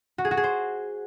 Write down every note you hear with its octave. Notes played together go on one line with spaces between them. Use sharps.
F#4
G#4
F#4
G#4
C5